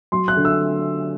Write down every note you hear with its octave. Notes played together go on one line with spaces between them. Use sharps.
F#3 C6
F#6
D3
E6